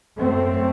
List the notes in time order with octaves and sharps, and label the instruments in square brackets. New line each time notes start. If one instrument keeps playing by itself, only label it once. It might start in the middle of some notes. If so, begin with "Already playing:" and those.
[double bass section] F#2 A3 C4